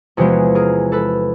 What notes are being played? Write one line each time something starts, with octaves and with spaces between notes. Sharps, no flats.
E2 C3 F3 G#3 B3 F#4 G#4
G#4 A#4
A4 B4